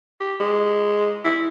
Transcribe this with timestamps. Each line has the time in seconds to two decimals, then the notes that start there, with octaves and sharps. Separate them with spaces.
0.20 G4
0.40 G#3
1.25 E4